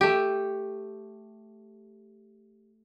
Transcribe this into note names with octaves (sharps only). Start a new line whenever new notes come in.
A3 G4